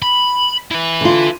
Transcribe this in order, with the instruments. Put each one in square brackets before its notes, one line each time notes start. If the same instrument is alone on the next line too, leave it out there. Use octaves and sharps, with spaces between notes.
[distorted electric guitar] B5
E4 B4
[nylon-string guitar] D3 F4